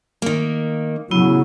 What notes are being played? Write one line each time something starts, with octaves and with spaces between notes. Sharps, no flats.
D#3 A#3
C#3 F#3 B3 E4